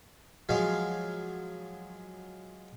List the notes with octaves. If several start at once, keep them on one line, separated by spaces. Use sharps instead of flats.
F3 F#3 G#3 F5